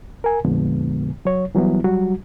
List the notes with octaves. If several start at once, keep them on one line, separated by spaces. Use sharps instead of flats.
A#4 G#5
F2 A#2 D3 F3 G#3 B3
F#3 C#5
E3 F#3 G3 B3 E4
F#3 G3 F#4